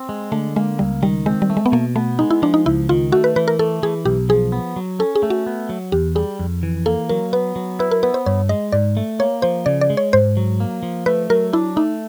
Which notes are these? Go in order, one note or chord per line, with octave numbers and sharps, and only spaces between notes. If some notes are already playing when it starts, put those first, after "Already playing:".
Already playing: C4
G#3
D3 A3
G#3 A#3
C#2 G3
D#3 G3
G#3 C4
G3
A3
G#3
B3
B2 A#3
A3 B3
G#3 D#4
E4
F3 D4
D#4
C#2 E4
D#3 F4
A3 F#4
B4
E3 B4
A#4
A3 A4
E3 G#4
B1 G4
F3 G#4
B3
F#3
C#4 A4
G#4
A3
F#4
B3
F#3
E2 G4
G3 G#4
F2
E3
A#3 A4
F#3 A#4
B3 B4
F#3
E4 B4
A#4
B3 B4
C5
G2 C#5
G#3 D#5
G#2 D5
A3
A#3 C#5
F3 C5
C#3 D5
D5
G#3
C#5
G#2 C5
F#3
A#3
F3
A3 B4
F#3 A#4
D4 E4
A3 D#4